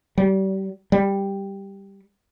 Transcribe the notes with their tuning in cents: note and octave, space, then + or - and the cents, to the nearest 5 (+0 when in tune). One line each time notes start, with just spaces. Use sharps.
G3 -30
G3 +5